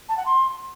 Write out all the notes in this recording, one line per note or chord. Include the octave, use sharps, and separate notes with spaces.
A5
F#5
C6